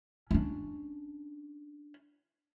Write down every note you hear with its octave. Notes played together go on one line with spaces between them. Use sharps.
C#4 D4